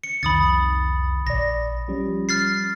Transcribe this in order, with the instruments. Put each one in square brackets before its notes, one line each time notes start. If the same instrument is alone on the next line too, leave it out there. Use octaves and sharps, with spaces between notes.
[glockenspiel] C#7
[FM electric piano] C2 F2 D#3 [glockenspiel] B5 D#6 A6
[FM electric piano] A#1 D5 [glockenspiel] A#6
[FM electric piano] F3 G3 C#4
[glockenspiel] F6 A6 C7